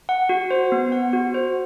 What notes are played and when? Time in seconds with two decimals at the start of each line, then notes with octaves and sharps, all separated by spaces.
0.09 F#5
0.29 F#4
0.51 C5
0.72 B3
0.92 F#5
1.13 F#4
1.34 C5